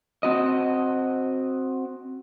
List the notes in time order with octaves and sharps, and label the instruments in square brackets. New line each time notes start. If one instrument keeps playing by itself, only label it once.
[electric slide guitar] C4 F#4 D#5